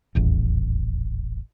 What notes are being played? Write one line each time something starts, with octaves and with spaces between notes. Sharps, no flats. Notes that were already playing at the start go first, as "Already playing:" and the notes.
D#1 A1 E2